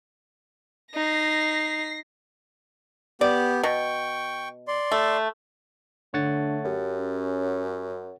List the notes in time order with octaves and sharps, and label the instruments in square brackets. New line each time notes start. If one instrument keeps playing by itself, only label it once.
[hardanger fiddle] D#4 [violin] A#6 C7
[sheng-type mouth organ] B3 G4 [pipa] D5
[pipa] B2 [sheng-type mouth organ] G5 C#6
[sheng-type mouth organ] D5 C6
[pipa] A3
[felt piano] D3 [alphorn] A3 [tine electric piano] C#5 F#5 A6
[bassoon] F#2 [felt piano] G4
[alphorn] C#4